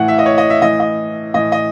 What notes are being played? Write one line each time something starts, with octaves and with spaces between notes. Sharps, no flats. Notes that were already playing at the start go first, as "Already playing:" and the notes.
Already playing: A2 E3 F#5
E5
D#5
C#5
D#5
E5
A2 E3 D#5
D#5
A2 E3 D#5
D#5